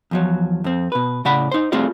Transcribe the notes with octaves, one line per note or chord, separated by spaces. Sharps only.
E2 F3 F#3
F2 C4
B2 B4
A2 C#3 D5 F#5 B5
D#4 C5
A3 C4 F4 F#4 G#4 D5